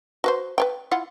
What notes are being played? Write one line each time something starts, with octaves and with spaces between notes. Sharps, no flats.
F#4 B4 C5
B4 C#5 G5
E4 F4 F#5